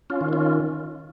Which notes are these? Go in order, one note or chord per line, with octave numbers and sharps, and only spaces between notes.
C#4 F4
D#3
C#4 F4